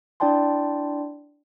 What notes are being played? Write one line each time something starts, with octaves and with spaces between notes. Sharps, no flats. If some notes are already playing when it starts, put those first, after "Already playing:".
D4 E4 D5 G5 A5 C6